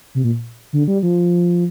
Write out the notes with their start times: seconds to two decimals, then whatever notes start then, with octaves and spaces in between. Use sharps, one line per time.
0.15 C3
0.24 A#2
0.73 D3
0.88 G3
1.03 F3